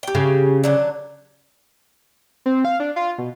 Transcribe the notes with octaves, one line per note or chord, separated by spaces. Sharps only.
G4 G5
C#3
D3 F#3 D4
C4
F5
D4
F4
B2